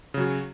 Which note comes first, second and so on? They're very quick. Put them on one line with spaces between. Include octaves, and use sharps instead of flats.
C#3 F#3 F#4